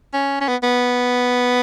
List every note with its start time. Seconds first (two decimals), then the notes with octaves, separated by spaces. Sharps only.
0.13 C#4
0.41 C#4
0.48 B3
0.63 B3